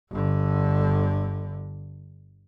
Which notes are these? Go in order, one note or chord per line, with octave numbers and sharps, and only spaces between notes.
G1 D3